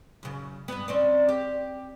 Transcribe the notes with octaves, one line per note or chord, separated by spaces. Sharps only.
F#2 C#3
G2 B3
C4 C#4 D5
G4